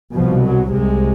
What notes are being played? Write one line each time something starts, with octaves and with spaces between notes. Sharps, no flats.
C2 B2 F3
F#3
C2 C3 G#3